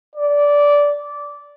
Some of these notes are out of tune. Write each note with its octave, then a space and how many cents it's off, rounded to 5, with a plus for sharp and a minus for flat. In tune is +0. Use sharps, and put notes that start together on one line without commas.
D5 -15